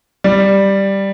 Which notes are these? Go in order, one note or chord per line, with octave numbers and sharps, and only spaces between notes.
G3